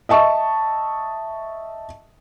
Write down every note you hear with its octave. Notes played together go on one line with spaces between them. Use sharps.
D#5 E5 A5 C#6